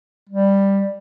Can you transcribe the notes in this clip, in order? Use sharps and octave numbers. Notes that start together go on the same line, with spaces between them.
G3